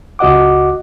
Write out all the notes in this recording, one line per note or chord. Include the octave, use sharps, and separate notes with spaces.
C#2 F#4 D#5 F#5 D6